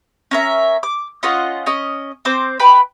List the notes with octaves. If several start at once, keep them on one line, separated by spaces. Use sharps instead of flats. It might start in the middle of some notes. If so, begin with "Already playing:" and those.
C#4 A#4 E5
D6
C#4 F4 D#5 F#5
C#4 D#5
C4 C5 D6
B4 G5 B5